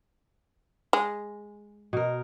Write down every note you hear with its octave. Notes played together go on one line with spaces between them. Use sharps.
G#3
B2 A#4